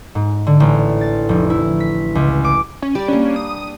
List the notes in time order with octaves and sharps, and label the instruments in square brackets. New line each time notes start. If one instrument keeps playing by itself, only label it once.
[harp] G#2
D3
A1
A6
F1
E4
B6
C#2
D6
[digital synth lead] C#4
[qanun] G3 [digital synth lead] D5
[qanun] A#3 D4 [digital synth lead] C#4
[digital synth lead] D#6